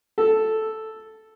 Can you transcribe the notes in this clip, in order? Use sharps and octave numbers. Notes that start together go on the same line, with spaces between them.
A4